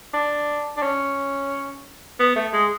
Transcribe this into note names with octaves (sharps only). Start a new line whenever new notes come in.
D4
D4
C#4
B3
A3
G#3